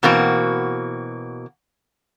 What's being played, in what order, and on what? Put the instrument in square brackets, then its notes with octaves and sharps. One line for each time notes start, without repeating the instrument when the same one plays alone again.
[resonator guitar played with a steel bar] B2 E3 A#3 C4 F#4